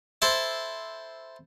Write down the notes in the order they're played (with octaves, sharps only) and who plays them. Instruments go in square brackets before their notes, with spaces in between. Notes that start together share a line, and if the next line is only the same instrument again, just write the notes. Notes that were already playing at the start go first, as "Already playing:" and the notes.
[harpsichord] E4 A4 C5